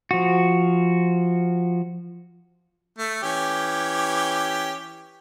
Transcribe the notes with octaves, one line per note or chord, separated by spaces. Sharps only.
F3 F#4
A3
E3 C#4 G4